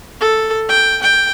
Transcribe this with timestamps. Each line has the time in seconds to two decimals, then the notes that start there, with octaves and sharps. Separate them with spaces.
0.20 A4
0.69 G5
1.02 G5